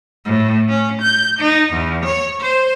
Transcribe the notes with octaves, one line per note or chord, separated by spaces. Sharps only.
A2
C#4
G6
D#4
E2
C#5
C5